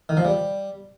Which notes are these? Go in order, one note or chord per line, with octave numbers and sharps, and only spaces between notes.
D#3
F3
G3